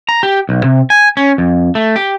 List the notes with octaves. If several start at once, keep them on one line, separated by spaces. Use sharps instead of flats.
A#5
G4
B1
C3
G#5
C#4
F2
A3
G4